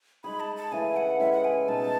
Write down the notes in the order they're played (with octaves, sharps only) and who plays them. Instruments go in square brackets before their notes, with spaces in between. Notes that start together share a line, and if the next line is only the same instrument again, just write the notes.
[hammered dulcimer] G#3 D#4 G#4 [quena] B5
[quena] A5
A5
[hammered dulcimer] C#3 E3 A3 E4 [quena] G#5
[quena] F#5
[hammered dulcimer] A2 G#3 C#4 E4 [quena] E5
[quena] F#5
G#5
[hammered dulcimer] B2 G#3 D#4 [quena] A5